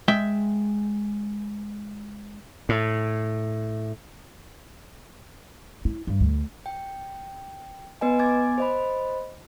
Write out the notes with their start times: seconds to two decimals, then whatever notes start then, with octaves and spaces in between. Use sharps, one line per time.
0.08 G#3 E5 G5
2.69 A2
5.85 E4
6.07 G2
6.20 D2
6.66 G5
8.01 B3 B4 D#5 G#5
8.19 B3 G#5 D6 G#6 A6
8.58 C5 D#5 B5